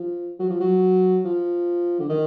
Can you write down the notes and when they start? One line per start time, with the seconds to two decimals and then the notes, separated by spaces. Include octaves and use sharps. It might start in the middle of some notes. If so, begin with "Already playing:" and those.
Already playing: F3
0.39 F#3
0.50 F3
0.60 F#3
1.24 F3
1.99 D3
2.09 D#3